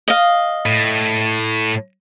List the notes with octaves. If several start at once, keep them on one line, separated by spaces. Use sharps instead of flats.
D#5 F5
A2